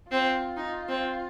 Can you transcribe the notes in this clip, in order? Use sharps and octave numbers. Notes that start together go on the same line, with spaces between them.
C4 F4
D#4
C4